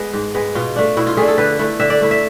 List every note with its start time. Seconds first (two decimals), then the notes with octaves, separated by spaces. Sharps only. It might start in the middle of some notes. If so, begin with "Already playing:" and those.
Already playing: G#3 B3
0.13 G#2
0.35 G#3 B3
0.55 B2 F4
0.76 A3 D4
0.97 B2 E4
1.07 F4
1.17 A3 D4 G#4
1.28 A4
1.38 D3 B4
1.59 A3 E4
1.80 D3 E5
1.90 D5
2.01 A3 E4
2.11 E5